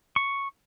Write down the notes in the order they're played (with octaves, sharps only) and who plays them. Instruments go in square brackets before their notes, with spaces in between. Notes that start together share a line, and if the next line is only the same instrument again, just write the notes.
[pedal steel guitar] C#6